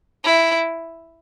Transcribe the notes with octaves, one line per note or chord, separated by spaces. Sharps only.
E4